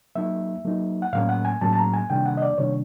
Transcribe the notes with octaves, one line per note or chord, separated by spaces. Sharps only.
F#3 A#3 D#4 E5
F#3 A#3 D#4
F#5
A2 F#3 A#3 C#4 F5
F#5
G#5
A2 F#3 A#3 C#4 A5
A5
A#5
G#5
C3 D#3 G3 A#3 D4 G5
F#5
D#5
D5
C3 D#3 G3 A#3 D4 C#5